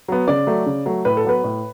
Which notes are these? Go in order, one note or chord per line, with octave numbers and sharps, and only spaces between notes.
F#3 B3
C#3 D5
F#3 A3
C#3
F#3 A3
A2 B4
A4
F#3 B3 B4
A2